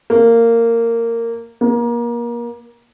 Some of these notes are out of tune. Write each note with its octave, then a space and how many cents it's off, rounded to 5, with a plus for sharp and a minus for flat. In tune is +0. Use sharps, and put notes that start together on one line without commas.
A#3 -15
A#3 +30